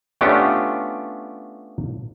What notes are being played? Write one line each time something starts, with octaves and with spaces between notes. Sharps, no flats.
A3 B3 C#4 D4 F4 G4